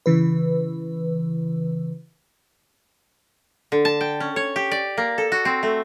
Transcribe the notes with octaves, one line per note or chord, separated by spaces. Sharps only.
C#3 E3 B4
D3
A5
G5
C#4
C#5
G4
D5
A#3
A4
F#4
C4
A3